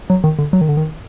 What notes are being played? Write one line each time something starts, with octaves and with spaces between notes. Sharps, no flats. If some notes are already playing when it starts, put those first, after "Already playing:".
F#3
D#3
D3
F#3
D#3
D3
D#3